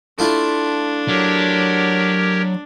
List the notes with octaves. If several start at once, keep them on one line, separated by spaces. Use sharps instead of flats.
A3 D4 E4 F4
F#3 G4 A#4 C#5